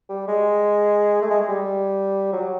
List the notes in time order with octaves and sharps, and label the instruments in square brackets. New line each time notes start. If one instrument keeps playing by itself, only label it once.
[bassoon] G3
G#3
A3
G#3
G#3
G3
F#3